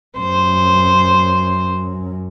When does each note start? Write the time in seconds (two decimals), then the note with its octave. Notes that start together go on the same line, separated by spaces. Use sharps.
0.18 F#2 C5